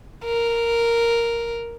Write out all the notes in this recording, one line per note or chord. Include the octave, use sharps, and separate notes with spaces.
A#4